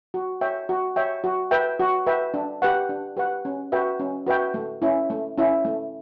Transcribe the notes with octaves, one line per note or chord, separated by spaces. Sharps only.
F#4
C#5 E5 G5
F#4
C#5 E5 G5
F#4
B4 E5 G5
F#4
B4 E5 G5
D4
G4 B4 F#5
D4
G4 B4 F#5
C#4
F#4 B4 E5 G5
C#4
F#4 B4 E5 G5
A3
C#4 E4
A3
C#4 E4
A3